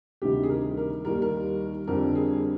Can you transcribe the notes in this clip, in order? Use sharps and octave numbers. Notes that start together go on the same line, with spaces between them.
D2 C3 D#3 G3 G4
G#4
A#4
A#4
D#2 D#3 G3 A#4
A#4
F2 D3 G3 A#4
G#4